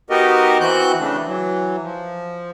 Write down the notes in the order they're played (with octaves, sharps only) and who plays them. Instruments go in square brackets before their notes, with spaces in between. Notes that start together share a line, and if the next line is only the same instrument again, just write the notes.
[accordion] B3 D#4 F#4 G4 A#4 D#5
E3 C4 F#4 F#6 G6
C#3 E3 A3 D4
E3 F#3
F3